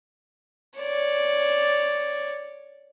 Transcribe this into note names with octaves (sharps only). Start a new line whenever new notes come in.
C#5 D5